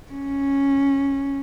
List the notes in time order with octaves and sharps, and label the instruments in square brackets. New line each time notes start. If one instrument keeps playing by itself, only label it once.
[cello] C#4